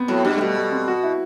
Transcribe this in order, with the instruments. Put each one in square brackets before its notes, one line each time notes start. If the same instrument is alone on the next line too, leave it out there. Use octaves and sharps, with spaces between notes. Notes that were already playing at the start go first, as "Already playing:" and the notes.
Already playing: [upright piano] B3 C4
[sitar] A2 [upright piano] F#3
[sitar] G2 [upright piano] G3
[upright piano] A3
[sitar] B2 [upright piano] G3
[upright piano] A3
C4
F#4
E4